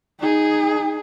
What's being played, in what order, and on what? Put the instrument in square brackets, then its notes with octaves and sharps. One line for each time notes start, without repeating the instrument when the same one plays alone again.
[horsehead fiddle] D#4 G#4